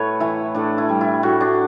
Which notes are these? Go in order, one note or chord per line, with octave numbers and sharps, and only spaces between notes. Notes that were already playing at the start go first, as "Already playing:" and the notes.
Already playing: A2 A3 B4 C#5
E3 E4
A2 D4
E4
G3
E4
A2 F#4
D4